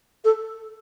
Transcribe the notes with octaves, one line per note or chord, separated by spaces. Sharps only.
A4